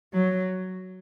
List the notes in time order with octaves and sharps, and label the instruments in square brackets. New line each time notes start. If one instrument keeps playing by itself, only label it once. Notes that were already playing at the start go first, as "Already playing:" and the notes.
[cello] F#3